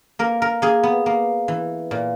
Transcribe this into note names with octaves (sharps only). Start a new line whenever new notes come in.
A#3 A#4
A#4
A#3 G#4
B3
A#3
E3
A#2